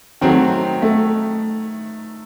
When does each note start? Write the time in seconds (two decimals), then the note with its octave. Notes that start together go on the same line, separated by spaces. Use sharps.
0.21 D#3 F#3 A3 C4
0.82 A3